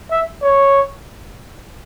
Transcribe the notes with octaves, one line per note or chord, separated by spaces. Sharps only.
E5
C#5